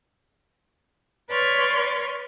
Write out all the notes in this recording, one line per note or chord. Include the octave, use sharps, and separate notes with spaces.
B4 C#5 D5 C6 C#6 F6